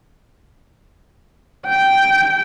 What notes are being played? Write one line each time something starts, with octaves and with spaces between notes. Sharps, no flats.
G5